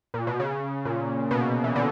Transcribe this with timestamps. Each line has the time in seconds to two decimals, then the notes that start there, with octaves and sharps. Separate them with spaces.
0.14 A#2
0.27 B2
0.40 C#3
0.85 A#2
1.31 B2
1.64 E3
1.76 D3